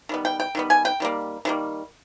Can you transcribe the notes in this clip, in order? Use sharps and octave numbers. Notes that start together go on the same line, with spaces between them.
D#3 G3 B3
G5
G5
D#3 G3 B3
G#5
G5
D#3 G3 A#3
D#3 G3 A#3